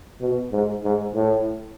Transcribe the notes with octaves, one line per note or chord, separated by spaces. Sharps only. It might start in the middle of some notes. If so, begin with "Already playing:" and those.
B2
G#2
G#2
A2